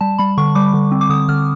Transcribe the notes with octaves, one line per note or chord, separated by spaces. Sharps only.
G3 A5
G3 B5
D3 C#6
G3 D6
D3
C4
D6
D3 D#6
D3 F6